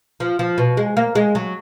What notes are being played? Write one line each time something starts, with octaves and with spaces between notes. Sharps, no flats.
F3
F3
B2
G#3
A#3
G#3
F#3